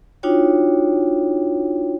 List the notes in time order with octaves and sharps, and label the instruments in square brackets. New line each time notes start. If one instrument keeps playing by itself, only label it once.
[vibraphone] D4 D#4 F4 F#4 C#5 G5